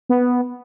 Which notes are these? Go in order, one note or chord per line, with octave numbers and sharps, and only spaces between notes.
B3